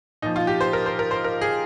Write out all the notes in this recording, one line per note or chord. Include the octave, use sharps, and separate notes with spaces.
A#2 F3 D#4
F4
G4
C5
A#4
C5
A#4
C5
A#4
G#4